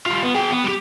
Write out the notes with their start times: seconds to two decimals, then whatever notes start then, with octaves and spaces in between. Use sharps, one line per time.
0.06 G3 F4
0.23 B3
0.35 G#4 G5
0.51 B3
0.64 G3 G4